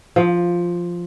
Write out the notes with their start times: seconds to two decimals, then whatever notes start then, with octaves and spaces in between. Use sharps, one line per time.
0.16 F3